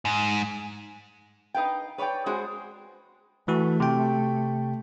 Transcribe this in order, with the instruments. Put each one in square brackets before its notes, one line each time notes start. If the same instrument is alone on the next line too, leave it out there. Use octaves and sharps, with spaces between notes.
[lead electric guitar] G#2
[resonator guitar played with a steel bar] D#4 B4 F5 G5
B4 C#5 D5 F5 G5
G#3 F#4 G#4 C5
[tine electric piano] E3 F#4 [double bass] A3
[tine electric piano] C3 G5